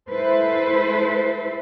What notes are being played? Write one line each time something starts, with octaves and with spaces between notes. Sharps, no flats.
G#3 E4 A4 B4 C5